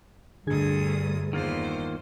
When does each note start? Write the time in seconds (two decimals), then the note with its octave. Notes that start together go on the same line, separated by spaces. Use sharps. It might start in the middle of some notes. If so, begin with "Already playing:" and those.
0.47 D2 G2 D3 G#4 D#6 G#6
1.33 E2 D#3 A#3 F4 C5